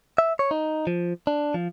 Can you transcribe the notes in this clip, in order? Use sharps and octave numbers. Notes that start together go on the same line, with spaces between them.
E5
C#5
D#4
F3
D4
F3